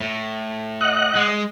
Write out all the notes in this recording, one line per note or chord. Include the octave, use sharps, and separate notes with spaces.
A2
D#5 F#5 F#6
G#3